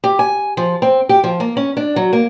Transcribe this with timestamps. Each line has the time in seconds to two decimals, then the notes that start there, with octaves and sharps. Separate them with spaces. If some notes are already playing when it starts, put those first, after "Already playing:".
0.04 G4
0.19 G#5
0.57 F3
0.82 C4
1.09 G4
1.24 F3
1.40 A#3
1.57 C#4
1.77 D4
1.96 F#3
2.13 A#3